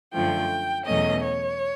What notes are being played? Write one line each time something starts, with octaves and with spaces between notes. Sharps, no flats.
F#2 D3 F3 A3 G5
E2 B2 F#3 A3 C#4 D#5
C#5